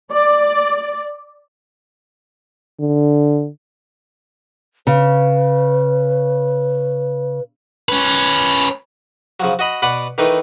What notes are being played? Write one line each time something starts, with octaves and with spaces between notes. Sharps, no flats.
D5
D3
C#3 B4
C#4 B4
C#3 F3 F#3
F#4 D#5 B5
B2 B4 D5 F#5 B5
D#3 E3 A3 D#4 B4